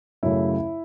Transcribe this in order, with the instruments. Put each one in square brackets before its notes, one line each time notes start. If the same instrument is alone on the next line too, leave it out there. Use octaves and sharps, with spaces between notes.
[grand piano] F#2 C#3 A3 E4